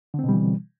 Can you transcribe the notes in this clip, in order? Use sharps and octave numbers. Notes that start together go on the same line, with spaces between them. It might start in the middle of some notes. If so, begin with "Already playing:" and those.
B2 D3 E3 G3 C4